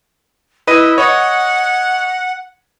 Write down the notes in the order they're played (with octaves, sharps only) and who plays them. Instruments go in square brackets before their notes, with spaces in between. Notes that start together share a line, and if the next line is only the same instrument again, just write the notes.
[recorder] E4 [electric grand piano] B4 D#5 D#7
[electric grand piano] C#5 D#5 [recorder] F#5